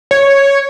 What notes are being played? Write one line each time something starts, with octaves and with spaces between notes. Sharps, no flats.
C#5